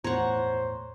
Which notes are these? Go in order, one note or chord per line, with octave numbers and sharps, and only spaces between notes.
E2 A2 C5 C#5 F#5 A#5